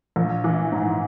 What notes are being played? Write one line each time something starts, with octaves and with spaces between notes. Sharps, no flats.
A#1
E3
G#2